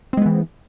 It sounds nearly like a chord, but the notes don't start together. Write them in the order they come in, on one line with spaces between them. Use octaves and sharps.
C4 G#3 B3 E3